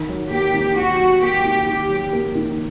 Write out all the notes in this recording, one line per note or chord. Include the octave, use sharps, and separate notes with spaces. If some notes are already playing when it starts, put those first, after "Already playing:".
Already playing: D#3
F#3
A#3 G4
D#3
D#3 F#4
F#3
A#3 G4
D#3
D#3 G4
F#3
A#3
D#3